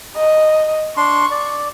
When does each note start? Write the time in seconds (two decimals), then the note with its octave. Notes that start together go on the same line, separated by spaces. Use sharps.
0.17 D#5
0.97 D4 C6 C#6
1.31 D5